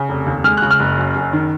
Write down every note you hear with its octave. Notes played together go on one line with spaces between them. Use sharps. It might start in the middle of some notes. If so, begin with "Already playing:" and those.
Already playing: C#3
F1
D#2
G#3 F6
C#3 F#6
F6
F#1
F#2
F#1
D#3